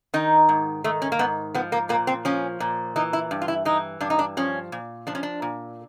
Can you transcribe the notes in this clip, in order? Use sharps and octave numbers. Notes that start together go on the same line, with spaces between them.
D#3 D#4
G#2
D#3 A3
C#4
A#3
G#2 B3
F3 B3
A#3
A#2 A#3
C4
F3 C#4
A#2
E3 D#4
E4
G2
F4
E4
E3 D#4
G2 D4
D#4
D4
F3 C#4
A#2
F3 D4
C#4
D4
A#2